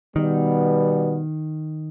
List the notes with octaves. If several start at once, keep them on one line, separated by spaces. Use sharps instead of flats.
B2 D#3 G3 B3